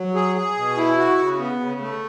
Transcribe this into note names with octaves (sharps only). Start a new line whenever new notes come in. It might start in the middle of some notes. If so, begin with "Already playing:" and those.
Already playing: F#3
G#4
G#4
B2
E4
F#4
C#3
B3
C#3
A3